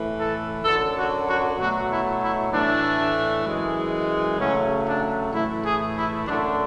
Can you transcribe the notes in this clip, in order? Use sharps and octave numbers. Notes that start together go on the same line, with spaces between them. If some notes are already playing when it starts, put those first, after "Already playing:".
Already playing: A2 E3 A3
A4
F#2 D3 F#3 A4
F#4
F#4
B2 F#3 A3 F#4
E4
E4
A2 E3 A3 D4
F#2 E3 G#3
C#3 F#3 A3 C#4
D4
A2 E3 A3 E4
G#4
E4
F#2 D3 A3 D4